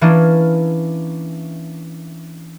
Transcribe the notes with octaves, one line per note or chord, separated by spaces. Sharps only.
E3 A#3 C#4 D4